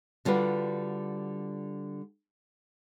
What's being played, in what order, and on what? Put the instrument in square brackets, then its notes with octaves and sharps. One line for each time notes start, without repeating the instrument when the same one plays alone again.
[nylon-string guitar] D3 G3 F4 F#4 B4